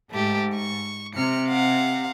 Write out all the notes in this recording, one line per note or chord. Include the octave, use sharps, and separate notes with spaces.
G#2 A3 G4
C#6
C3 F6 C#7
F5 F#5